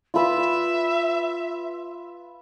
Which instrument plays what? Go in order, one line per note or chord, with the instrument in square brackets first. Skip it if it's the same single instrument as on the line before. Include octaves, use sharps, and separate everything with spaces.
[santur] F4 B4 E6 [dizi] E5